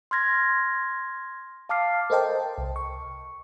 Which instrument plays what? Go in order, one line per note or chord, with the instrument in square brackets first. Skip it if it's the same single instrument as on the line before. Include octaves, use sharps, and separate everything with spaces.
[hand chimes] C6 F6 G#6 A#6
F5 A5 D6 F6 C7
[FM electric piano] A4 A#4 C5 D#5 G5 A5
C2
C#6